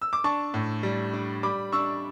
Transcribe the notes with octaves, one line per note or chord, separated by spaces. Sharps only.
E6
D6
D4 A5 C#6
A2
G3
D4
G3 B5 D6
D4 C#6 E6